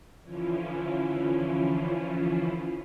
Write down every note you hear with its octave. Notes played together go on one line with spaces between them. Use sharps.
D3 E3 F3 C#4 E4 F4